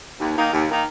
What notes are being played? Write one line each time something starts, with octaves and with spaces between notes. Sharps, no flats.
D#2
D#3 A#3 D#4
D#2
D#3 A#3 D#4